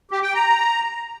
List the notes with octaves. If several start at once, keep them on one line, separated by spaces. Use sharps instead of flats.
G4
G5
A#5